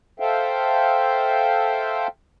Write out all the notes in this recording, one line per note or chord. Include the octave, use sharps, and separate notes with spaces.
A4 C5 E5 F5 G5